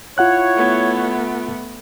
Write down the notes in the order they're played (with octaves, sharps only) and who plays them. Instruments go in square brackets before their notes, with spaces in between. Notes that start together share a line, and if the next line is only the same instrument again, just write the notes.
[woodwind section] E4 C#5 [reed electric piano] F4 F#5 F#6
[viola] A3 B3